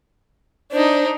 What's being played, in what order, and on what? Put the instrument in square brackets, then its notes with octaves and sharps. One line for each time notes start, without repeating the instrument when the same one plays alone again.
[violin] D4 D#4 [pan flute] C5